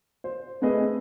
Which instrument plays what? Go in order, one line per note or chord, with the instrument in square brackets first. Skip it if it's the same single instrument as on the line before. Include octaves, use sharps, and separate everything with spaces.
[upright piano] C5
A3 C4 G#4 B4 D#5